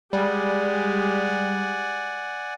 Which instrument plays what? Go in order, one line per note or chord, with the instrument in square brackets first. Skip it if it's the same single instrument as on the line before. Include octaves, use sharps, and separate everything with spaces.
[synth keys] G3 [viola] G#3 G4 [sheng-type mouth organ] D5 F#5 G#5